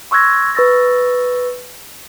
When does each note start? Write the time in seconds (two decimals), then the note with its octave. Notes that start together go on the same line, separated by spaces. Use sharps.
0.11 C6 C#6 E6 F#6 G#6 A#6
0.55 B4 C#6 E6 A6 A#6